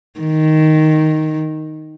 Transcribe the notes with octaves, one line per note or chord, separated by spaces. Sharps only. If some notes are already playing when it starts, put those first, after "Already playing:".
D#3